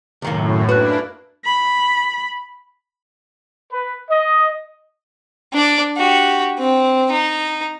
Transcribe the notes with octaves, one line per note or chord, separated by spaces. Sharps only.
C#2 F#2 A2 D#3 A#3
A#3 D4 E4 F#4 B4 F#6
B5
B4
D#5
D4 D5
F#4 G4
C4
D#4